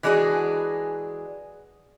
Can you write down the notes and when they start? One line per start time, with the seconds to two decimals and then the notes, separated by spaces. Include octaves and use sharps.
0.03 E3 G#3 D4 F#4 G#4